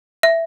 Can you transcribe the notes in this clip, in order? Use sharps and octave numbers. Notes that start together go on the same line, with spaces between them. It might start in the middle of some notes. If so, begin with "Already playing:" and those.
E5